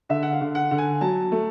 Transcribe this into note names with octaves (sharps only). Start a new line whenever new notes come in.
D3 E5
F#5
F5
D3
F#5
D3
G#5
F#3 A5
A3